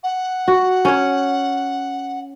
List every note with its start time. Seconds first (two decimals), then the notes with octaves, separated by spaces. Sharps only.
0.03 F#5
0.48 F#4
0.85 C#4 C#5